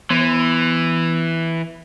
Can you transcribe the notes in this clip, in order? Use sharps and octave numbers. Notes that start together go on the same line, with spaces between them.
E3 B3 F7